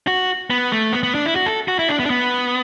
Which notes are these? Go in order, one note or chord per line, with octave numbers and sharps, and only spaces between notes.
F#4
B3
A3
B3
B3
D4
E4
F#4
A4
F#4
E4
D4
B3
D4
B3